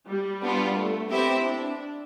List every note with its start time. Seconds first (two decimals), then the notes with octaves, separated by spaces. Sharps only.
0.08 G3
0.43 B3 D4 F4
0.77 A3
1.10 B3 C4 E4 G4 C5 E5
1.45 D4